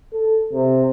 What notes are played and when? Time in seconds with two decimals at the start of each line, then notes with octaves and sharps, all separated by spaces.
0.14 A4
0.53 C3